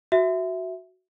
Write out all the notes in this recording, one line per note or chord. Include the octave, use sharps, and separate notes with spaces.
F#4 E5